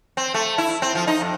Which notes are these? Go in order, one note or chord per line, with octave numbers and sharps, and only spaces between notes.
C4
A3
E4
C4
F3
D#4
F2